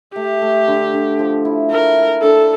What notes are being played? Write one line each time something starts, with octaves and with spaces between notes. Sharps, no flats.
A3 G4
A3
D3
D3
F3
E4
A3 A#4
E4
D4 A4